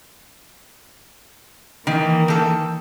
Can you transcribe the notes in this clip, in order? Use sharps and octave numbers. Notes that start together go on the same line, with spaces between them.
D#3 E3 A#3
D#3 A4